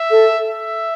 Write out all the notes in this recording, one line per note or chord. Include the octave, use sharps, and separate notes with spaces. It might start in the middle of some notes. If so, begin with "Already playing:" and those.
Already playing: E5
A4
E5